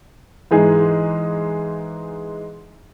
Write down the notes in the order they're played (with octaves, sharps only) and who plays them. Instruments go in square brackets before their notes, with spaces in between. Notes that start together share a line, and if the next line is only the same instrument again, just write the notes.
[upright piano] G#2 E3 G#3 D#4 G#4